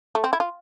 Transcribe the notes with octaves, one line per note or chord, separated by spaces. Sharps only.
A3
C4
E4
F4